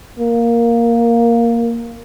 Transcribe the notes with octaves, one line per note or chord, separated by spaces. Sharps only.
A#3